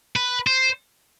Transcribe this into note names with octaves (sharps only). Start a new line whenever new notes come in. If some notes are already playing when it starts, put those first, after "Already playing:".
B4
C5